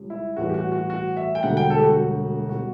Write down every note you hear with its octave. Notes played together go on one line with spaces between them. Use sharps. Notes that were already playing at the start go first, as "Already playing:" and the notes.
Already playing: C#2 C#3 G3
E4
A1 A2 E3 G3 F#4
G4
F#4
F#4
F#4
E5
G5
E1 D2 D3 G3 F#5
G5
A4
G4
F#4
B2 G3 F#4